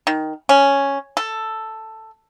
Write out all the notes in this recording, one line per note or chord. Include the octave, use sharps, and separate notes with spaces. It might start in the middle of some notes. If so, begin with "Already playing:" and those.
D#3
C#4
A4